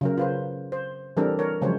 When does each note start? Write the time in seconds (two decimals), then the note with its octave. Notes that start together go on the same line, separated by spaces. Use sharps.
0.01 C#3 F#3 A#4
0.18 F4 B4 C5
0.72 C5
1.17 E3 G3 C4 D4 A4 A#4
1.39 A#4 C#5
1.61 C#3 F3 F#3 G#3 C5 C#5